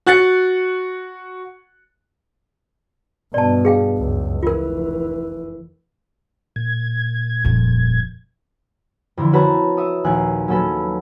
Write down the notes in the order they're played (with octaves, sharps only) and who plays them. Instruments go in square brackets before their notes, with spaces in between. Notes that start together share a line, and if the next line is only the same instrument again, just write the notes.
[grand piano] F#4 F#6 A6 C#7
[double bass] G2 B2 [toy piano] D5 A5
[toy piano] G#4 F5 G5
[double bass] C#2 F#2
[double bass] F1 E3 [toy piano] F4 A#4
[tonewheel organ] A#2 G#6
[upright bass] D#1 F2
[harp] F2 D3 E3
C4 F#4 B4 C#5 A5 A#5
E5 C#6 D#6
A#1 D#2 G#5 F#6
F#3 A#3 C#4 A4 B4